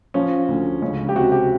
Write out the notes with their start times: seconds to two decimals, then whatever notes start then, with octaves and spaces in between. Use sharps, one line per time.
0.14 F3 C#4
0.48 D2
0.82 C#2 C#4
1.09 G4
1.16 C3 F#4
1.32 G4